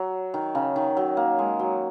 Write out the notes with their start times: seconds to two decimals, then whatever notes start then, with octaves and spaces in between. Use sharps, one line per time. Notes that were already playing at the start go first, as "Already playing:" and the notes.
Already playing: F#3
0.34 D#3
0.55 C#3
0.76 D#3
0.97 F#3
1.17 A#3
1.39 G#3
1.59 F#3